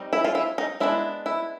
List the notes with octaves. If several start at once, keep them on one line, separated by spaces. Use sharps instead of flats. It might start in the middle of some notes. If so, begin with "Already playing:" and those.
Already playing: G3 C4 D#4
E4
F4
E4
D#4
G#3 B3 D4 E4
E4